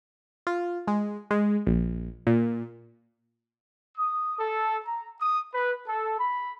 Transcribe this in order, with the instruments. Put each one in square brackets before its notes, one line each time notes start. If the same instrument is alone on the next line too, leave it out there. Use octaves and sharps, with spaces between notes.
[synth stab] F4
G#3
G#3
A#1
A#2
[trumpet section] D#6
A4
A#5
D#6
B4
A4
B5